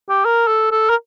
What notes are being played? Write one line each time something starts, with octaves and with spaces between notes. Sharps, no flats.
G4
A#4
A4
A4
A#4